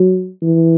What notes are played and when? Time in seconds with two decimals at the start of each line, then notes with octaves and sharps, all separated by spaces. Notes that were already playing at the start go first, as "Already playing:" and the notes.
Already playing: F#3
0.42 E3